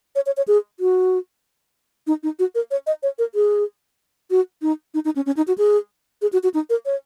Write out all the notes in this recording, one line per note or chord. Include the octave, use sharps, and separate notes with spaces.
C#5
C#5
C#5
G#4
F#4
D#4
D#4
F#4
A#4
C#5
D#5
C#5
A#4
G#4
F#4
D#4
D#4
D#4
C#4
C#4
D#4
F#4
G#4
G#4
F#4
F#4
D#4
A#4
C#5